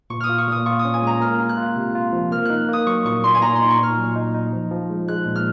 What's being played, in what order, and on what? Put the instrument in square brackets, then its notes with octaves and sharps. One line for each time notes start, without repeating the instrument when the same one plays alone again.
[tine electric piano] A#2 [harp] C#6
[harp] D#6 F6
[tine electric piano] F4
[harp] C#6
[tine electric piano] A#2 [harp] D#6
[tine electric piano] F4 [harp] C#6
[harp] D#6
[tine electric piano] C#4
[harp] G#5
[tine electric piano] G#3 [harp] A#5
[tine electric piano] A#3 [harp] F6
[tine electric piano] F4
[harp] F#6
[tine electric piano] F4
C3
F4
F3
[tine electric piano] A#3 [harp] F6
[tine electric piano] D#4 [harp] F#6
[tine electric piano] A#3 [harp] D#6
[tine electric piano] F#3 [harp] C#6
[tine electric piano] A#2 [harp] C#6
[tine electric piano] A#2 [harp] C6
[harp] G#5
[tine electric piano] A#2 [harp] A#5
[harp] C6
[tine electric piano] D#4
[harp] C#6
[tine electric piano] A#2 [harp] F6
[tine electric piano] F#3
D#4
D#4
F3
F3
G#3
[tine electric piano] G#3 [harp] F#6
[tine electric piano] A#2
[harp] F6